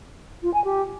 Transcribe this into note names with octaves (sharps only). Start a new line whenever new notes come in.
F4
G#5
G4